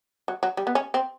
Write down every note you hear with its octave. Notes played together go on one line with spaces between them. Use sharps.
F#3
F#3
G3
B3
C#4
C4